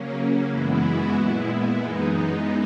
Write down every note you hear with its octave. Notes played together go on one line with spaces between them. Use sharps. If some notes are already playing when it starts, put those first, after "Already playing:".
Already playing: C#3 F#3 A#3 C#4
F#2 E3 G#3 B3 E4
F#4
A#2 G#3 B3 E4
F#2 E3 G#3 B3 D#4